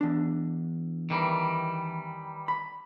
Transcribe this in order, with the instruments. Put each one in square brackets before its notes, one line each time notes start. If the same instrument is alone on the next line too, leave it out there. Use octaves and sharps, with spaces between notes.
[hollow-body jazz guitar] E2 D4
[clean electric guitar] D#3 E3 G3
[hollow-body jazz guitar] B5